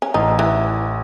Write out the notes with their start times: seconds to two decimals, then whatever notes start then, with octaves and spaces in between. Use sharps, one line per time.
0.02 C#4
0.14 A1 D#4
0.39 E3